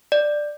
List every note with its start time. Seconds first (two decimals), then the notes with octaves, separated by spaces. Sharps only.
0.12 D5